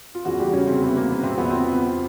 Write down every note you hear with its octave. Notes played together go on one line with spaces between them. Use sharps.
F4
E2 C#3 E3 F#3 F#4
G3 G4
C#3 C#4
C3 C4
E2 C#3 E3 B3
A#3
B3
C3 C4
E2 C3 F3 B3
C4
B3